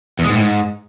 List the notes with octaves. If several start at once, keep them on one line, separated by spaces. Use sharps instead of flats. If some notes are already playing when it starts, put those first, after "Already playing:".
E2
G#3
G#2
A2
G#2